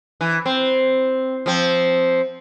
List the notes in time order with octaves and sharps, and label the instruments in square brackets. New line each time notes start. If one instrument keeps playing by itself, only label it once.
[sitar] E3
C4
F3 C4